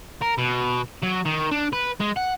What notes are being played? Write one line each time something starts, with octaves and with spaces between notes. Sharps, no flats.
A#4
B2
F#3
D#3
D4
B4
G#3
F#5